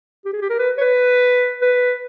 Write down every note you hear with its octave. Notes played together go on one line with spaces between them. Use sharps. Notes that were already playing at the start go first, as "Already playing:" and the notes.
G4
G#4
G4
A#4
B4
C#5
B4
B4